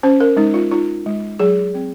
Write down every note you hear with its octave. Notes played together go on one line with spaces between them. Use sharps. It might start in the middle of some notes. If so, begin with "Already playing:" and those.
C#4 C5
A#4
G#3 D#4
F4
D#4 F4
G#3
F#3 G#4
C4